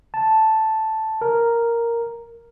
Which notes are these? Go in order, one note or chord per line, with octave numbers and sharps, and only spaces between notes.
A5
A#4